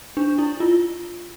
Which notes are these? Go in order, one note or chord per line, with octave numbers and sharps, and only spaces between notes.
D4
E4
F4